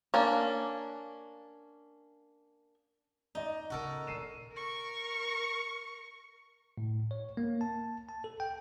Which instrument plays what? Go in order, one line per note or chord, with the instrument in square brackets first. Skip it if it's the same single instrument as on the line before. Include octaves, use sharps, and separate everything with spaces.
[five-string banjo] A#3 C#4 D4
[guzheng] D#4 [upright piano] D5 D#5
[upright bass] C#3 B3 [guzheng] F#4 A4 A#4
[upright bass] A#1 D#2 [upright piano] C7 D#7 E7
[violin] A#4 C#6
[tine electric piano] A2
C#5
A#3
A5
A5
A4
G5